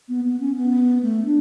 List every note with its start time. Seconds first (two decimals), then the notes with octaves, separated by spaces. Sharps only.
0.09 B3
0.25 B3
0.40 C#4
0.56 B3
1.03 A3
1.26 D4